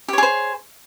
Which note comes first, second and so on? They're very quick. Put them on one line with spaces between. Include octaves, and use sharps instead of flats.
G4 C#5 G#4 C5